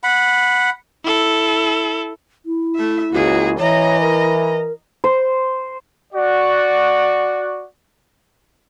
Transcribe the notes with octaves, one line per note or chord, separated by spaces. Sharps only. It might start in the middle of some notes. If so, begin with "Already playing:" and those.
F#5 B5
E4 A4
E4
A3 E5
C#2 A#3 F#4 G#4
E3 C#5 D#5 A#5
A#4
C5
F#4 D5